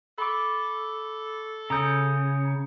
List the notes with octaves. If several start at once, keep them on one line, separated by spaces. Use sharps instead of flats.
A4 B5 C#6 D6
C#3 A#5 D#6 G6